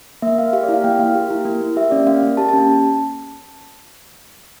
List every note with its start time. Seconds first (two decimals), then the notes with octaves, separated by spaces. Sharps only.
0.22 A#3 E5
0.38 A#3 F5
0.53 G4 F5
0.63 D5
0.69 E4
0.74 F5
0.84 A#3 G5
0.99 A#3 F5
1.15 G4
1.30 E4
1.45 A#3
1.61 A#3
1.76 G4 E5
1.91 C#4 D5
2.07 A#3 F5
2.23 A#3
2.37 G4 A5
2.49 A5
2.53 C#4
2.59 A5